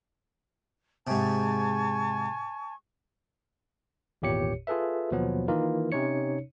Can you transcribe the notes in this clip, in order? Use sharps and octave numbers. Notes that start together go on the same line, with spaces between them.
G#2 C3 G#5 A5 C#6
G#1 E2 A#2 G4 C#5 C#7
F4 G#4 A4 B4 E5
D#2 B2 F3 F#3 B3
D#3 E3 A#3 D#4 F4 A#4
C3 C#4 D#4 C#5 C#7